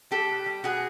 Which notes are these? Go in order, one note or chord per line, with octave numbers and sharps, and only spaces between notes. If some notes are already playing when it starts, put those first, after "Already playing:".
G3 G4 A4
B2
G3
B2 F#4 G#4